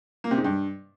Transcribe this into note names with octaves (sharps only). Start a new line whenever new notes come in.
A#3
C3
G#2
G2